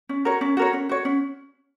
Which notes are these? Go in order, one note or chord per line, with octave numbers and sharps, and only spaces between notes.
C#4
F#4 A#4 C#5
C#4
F#4 A#4 C#5
C#4
F#4 C#5
C#4